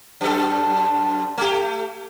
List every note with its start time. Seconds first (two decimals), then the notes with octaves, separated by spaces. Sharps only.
0.21 F#2 A4
1.38 A3 G4